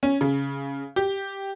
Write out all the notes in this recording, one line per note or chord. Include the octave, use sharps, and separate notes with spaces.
C#4
C#3
G4